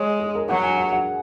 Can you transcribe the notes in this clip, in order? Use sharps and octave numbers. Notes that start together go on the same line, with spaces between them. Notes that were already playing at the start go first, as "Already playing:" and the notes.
Already playing: G#3 C#5
G#4
A#4
F#3 F#5
G#5
F#5
F#5